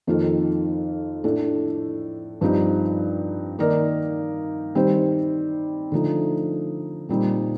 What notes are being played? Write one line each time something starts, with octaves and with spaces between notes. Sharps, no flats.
F2 D#3 A#3 F4 A4
A2 A3 D4
G2 F3 C4 D#4 G4
D#3 A#3 D#4 A#4 D5
D#3 G3 C4 G4 C5
D3 F3 A3 D#4
A#2 G3 C4 D#4